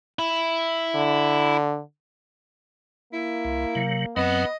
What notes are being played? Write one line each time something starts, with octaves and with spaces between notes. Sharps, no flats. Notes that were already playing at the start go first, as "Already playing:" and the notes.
E4
D3
A#3 E4
C2
C3 F#3
F#2 F#3 B3 C4 D#5